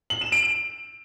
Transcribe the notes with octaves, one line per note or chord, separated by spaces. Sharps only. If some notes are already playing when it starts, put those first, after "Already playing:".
F#7
E7
D7